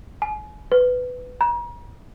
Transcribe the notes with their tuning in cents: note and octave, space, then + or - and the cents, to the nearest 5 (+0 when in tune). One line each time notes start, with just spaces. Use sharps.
G#5 +35
B4 +15
A#5 +40